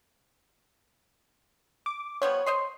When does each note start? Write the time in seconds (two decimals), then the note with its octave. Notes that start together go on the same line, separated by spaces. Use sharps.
1.86 D6
2.22 F3 G3 B3 C#5
2.46 C5 D#5 C6